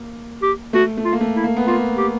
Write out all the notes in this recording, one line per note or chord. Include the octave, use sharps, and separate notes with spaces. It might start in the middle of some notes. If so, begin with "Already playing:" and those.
Already playing: A#3
G4
A3 F#4
A3
F4
A#3
A3
E4
A#3
B3
A#3 F4
G4